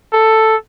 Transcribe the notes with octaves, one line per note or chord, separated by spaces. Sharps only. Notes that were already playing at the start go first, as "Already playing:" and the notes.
A4